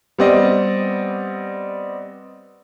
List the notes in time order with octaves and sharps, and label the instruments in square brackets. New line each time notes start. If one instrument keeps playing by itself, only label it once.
[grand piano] G3 B3 C4 D5 D#5